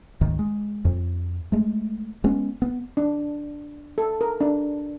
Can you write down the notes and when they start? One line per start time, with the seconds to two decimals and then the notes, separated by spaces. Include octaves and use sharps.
0.21 C#2 G#2 D#3
0.39 G#3
0.85 F2
1.52 G#3 A3
2.24 G#3 B3 C#4
2.62 B3
2.97 D4
3.98 A4
4.21 A#4
4.41 D4